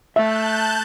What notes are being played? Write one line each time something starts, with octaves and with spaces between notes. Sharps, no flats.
A3 E5 A5 F#6 G6